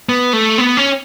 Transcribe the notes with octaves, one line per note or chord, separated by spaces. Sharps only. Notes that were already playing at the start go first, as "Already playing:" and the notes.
B3
A3
B3
C#4